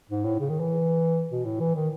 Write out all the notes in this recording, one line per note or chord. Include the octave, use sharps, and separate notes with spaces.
G#2
A2
C#3
D#3
E3
B2
A2
E3
D#3